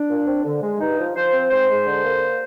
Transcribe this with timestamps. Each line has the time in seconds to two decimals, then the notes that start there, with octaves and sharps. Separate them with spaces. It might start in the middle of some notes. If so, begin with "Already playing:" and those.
Already playing: D4
0.09 A#2
0.27 C4
0.45 D3
0.63 G#3
0.80 G2 D#4
0.99 F3
1.16 F3 C5
1.33 C4
1.51 G#2 C5
1.69 G#3
1.86 D3
2.05 A#3